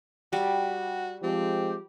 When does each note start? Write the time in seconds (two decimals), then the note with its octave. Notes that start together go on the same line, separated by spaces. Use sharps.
0.33 G3 F#4
1.23 F3 G#3 C4 G4